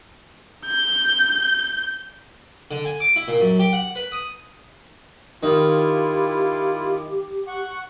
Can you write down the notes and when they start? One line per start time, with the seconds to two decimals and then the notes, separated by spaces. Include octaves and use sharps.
0.65 G6
2.71 D3
2.85 G#5
3.00 D6
3.16 E4
3.28 A#2
3.40 F#2
3.59 G4
3.73 F#5
3.95 B4
4.12 D#6
5.43 D#3 E4 F4 G4
7.47 F#5 C#6